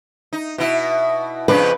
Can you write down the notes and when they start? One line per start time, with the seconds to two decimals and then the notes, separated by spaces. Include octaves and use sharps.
0.33 D#4
0.58 B2 E4
1.48 F2 C#3 D4 B4